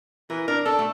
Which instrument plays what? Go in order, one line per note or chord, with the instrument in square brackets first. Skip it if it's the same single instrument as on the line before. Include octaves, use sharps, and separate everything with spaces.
[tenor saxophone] E3 [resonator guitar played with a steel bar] A#4
[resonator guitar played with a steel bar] D4 [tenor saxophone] A#4
[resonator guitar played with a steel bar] D4 [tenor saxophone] A4
[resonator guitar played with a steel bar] A3